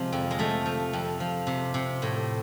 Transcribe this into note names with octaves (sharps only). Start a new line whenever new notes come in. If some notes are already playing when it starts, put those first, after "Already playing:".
Already playing: C3 F3 G#3
F2
G#3
F3 A3
F3
F2
F3
C3
C3
A2